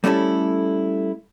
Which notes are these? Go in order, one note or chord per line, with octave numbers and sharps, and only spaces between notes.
G3 A3 C#4 E4 A4